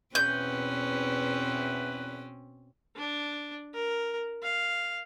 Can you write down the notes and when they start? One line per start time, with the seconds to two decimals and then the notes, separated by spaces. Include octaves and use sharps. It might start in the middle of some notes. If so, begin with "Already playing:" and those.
0.15 E2 B2 C4 C#4 B4 G6
2.96 D4
3.74 A#4
4.43 F5